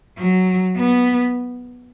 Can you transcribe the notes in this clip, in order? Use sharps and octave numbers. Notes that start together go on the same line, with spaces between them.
F#3
B3